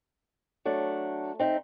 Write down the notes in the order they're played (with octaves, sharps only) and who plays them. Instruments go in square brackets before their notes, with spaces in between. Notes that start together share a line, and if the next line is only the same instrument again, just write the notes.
[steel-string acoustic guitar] F#3 A3 D4
C4 D#4 E5